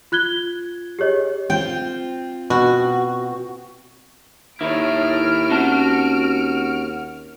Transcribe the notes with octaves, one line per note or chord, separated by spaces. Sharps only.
F4 F#6 G#6 G7
G4 G#4 C#5 D#5
C4 F4 G5
B2 F#4
D#2 D#3 E4 C#5 F6 D7
C4 C#4 F#4 A5